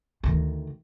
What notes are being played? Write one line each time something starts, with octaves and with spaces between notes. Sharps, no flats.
D2 D#3